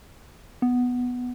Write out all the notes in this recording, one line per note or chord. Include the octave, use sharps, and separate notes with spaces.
B3